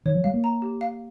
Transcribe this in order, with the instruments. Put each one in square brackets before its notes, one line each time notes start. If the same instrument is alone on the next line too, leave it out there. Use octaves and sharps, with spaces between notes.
[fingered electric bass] D#3 [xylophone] C#5
[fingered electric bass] F3
[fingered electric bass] G3 [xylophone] F5
[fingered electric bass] A#3
[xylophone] A#5
G4
F5